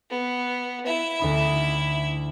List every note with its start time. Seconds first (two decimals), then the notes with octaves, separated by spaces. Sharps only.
0.10 B3
0.86 E4 E5
1.19 D2 D#4 B5